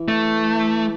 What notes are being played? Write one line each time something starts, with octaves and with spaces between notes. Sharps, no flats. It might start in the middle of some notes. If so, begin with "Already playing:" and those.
Already playing: E3
A3